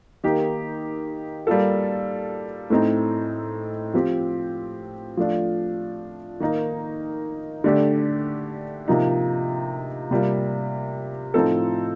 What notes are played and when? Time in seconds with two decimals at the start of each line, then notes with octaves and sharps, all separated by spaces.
0.24 D#3 A#3 D#4 G4
1.47 G3 A#3 F4 A4
2.70 A2 A3 C4 D#4
3.94 F3 C4 G4
5.17 F3 A3 D4 F4
6.40 D#3 A#3 D#4
7.64 D3 A3 D4 G4
8.88 C3 F3 A#3 D#4
10.11 C3 G3 A#3 F4
11.34 A2 F3 C4 D#4 A4